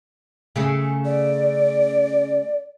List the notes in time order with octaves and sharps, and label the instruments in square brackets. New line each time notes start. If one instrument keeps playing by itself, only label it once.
[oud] C#3 A3 G#4
[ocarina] D5